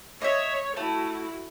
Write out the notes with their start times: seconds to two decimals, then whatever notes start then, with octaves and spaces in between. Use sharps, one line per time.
0.22 C#5 D#5 E5
0.77 A3 E4 F#4